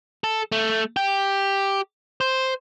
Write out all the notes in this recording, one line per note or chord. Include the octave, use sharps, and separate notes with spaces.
A4
A3
G4
C5